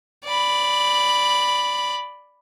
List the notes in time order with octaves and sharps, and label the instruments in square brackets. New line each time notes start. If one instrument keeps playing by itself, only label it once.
[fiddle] D5 B5